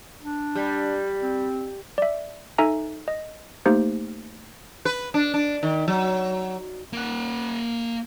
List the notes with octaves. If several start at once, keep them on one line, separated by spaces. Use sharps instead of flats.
D4
G3
C4
D5 E5
D#4 A4 E5 G#5 A#5
D#5
A3 A#3 D#4 G4 C5
B4
D4
D4
D#3
F#3
A#3 F#5